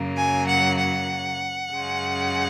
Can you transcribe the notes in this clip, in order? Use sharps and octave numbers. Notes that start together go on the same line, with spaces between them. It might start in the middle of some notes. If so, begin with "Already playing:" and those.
Already playing: F#2 C#3 F#3 A#3
G#5
F#5
F#5
F#2 C#3 G#3